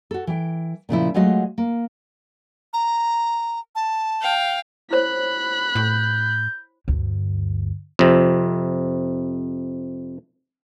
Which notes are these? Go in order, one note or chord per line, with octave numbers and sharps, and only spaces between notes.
F#4 A4
E3 G5
A#2 C#3 F3 E4
F#3 G#3 A3 F4 F#4 D#5
A#3
A#5
A5
F5 G5
E4 C5 C#5 B5 F#6
A2 G6
D2 G2
F2 C3